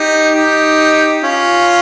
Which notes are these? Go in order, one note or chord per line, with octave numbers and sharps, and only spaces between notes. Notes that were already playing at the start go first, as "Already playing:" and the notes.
Already playing: D#4 G4
D#4 G4
C#4 F4